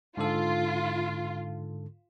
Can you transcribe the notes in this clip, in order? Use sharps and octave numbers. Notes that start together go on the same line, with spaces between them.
G#2 D3 F4 A4